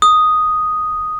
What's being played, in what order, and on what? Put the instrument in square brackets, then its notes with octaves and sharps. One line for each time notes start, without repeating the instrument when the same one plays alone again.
[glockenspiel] D#6